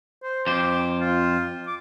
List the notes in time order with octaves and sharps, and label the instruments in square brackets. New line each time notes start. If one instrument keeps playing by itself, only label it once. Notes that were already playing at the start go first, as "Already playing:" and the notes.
[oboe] C5
[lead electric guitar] F2 C5 [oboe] D6
[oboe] F4
D6